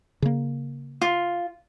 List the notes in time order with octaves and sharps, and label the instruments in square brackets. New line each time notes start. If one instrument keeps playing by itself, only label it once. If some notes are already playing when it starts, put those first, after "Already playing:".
[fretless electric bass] C#3 A#3
[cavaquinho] F4